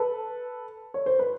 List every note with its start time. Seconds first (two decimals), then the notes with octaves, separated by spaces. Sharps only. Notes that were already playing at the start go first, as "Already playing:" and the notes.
Already playing: A4 B4
0.94 C#5
1.06 C5
1.19 B4